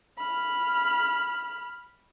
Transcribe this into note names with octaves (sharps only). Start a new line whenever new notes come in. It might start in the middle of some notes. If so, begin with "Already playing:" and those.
B5 F6